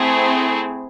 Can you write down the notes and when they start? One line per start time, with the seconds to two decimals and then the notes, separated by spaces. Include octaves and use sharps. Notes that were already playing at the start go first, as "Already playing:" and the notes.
Already playing: A3 C4 E4 G#4